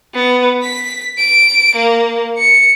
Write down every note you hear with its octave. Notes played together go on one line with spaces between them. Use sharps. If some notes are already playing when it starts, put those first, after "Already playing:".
B3
B6
D7
A#3
C#7